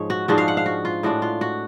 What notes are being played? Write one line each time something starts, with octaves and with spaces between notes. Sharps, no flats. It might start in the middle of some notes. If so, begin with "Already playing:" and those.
Already playing: G#2 F3 G#3 C#5
F#4
G#2 F3 G#3 D4 F#4
F5
F#5
F5
F#4
F4
A2 G#3 D4 F#4
F4
F#4